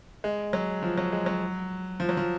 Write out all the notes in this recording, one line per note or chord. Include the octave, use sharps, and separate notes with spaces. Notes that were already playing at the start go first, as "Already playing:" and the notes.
G#3
F#3
F3
F#3
G#3
F#3
F3
F#3
F3